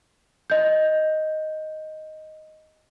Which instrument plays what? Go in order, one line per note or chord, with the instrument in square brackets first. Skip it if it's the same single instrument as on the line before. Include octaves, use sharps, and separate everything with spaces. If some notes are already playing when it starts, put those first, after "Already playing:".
[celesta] D#5 G6